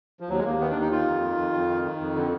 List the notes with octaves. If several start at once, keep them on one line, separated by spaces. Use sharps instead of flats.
F3
D#2 F#3
G#3
D#2 A#3
D#3 B3
D4
D#2
D#4
D#3 F4
F2
D#3
F2
F2
D#3
D#3
F2
D3